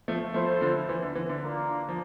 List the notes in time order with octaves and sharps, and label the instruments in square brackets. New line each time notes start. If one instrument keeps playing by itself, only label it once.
[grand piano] F3 A3
[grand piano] F3 A3 [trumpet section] E4 A4 C5
[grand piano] D3 F3
E3
D3
E3
D3
[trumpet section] A#3 D4 F4 A#4 F5
[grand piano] F3